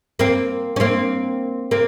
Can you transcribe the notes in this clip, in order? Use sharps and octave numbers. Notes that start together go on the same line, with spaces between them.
A#3 C4
C#4
A#3 C4
A#3 C4